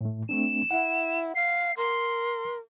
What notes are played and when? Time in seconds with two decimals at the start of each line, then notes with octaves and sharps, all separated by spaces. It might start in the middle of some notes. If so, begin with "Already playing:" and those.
0.01 A2 A3
0.29 A3 C4 D4 E7
0.71 E4 F#5
1.35 F5 C7
1.77 A#4 C6